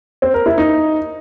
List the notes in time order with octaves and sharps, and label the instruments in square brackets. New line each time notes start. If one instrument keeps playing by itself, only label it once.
[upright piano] C4
A#4
E4
D#4